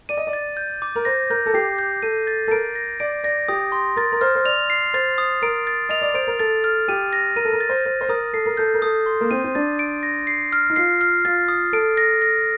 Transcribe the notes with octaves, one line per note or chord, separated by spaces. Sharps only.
D5 D#7
D#5
D5
A6
G6
D6
A#4
C5 A#6
A#4 G6
A4
G4 C7
G6
A4 D#7
A6
A4
A#4 D7
A#6
D5 D7
D5 A#6
G4 D#6
C6
A#4 A6
A#4
C5 F6
C5
D5 F7
C7
C5 A6
D#6
A#4 D7
A6
D#5 F7
D5
C5 D7
A#4
A4 A6
F6
G4 D#7
A#6
A#4 D#7
A4
A#4
A6
C5
C5 A6
C5
A#4 D#6
A4 C7
A#4
A4 G6
A#4
A4 D#6
C6
A#3
C4 D#7
C4
D4 A6
D7
A#6
C7
F6
D#4
F4 C7
F6
F4 A6
D#6
A4 D7
A#6
A#6